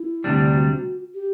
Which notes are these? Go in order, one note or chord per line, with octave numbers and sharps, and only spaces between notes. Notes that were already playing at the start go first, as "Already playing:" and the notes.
Already playing: E4
D2 C3 G3 D4
F#4
G4